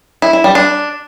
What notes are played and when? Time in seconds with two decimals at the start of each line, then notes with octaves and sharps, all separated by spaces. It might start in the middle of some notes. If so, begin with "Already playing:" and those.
0.22 E4
0.33 E4
0.44 G3
0.55 D4